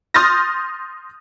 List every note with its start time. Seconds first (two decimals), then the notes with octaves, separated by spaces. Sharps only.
0.14 C6 D#6 F6 G6 A6 A#6